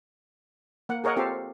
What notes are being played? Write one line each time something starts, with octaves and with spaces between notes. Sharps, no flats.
A#3 F#5
G#4 A#4 C#5 D#5 F#5
C4 F4 G4 A4 F5